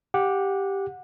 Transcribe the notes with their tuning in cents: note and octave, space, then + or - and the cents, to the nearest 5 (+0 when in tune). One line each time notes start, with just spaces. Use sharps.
G4 +0 F#5 -20